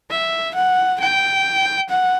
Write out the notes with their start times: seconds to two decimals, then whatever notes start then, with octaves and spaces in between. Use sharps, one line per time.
0.11 E5
0.55 F#5
1.00 G5
1.89 F#5